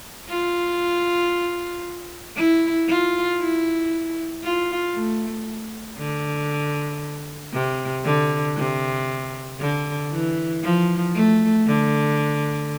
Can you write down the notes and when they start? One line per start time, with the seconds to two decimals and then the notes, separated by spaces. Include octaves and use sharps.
0.29 F4
2.36 E4
2.88 F4
3.40 E4
4.43 F4
4.95 A3
5.98 D3
7.53 C3
8.05 D3
8.57 C3
9.60 D3
10.12 E3
10.63 F3
11.15 A3
11.67 D3